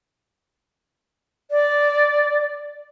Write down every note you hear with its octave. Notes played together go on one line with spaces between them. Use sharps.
D5